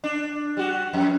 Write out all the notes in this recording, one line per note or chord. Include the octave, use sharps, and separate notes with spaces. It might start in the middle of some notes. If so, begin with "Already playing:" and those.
D4
G3 F#4
F2